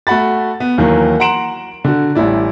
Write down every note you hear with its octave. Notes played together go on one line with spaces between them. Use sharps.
A3 F#4 F#5 B5 A6
B3
D#2 D#3 E3 F#3
F#5 A#5 C6 D7 E7 F#7
D3 F#4
A1 G3 E4 D5